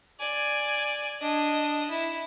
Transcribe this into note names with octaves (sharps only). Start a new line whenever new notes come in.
D5 G#5
D4 D#5
E4